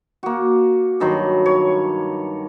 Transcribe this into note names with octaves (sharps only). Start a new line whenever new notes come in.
A#3 F#4
G2 D#3 F#3 C6
C#5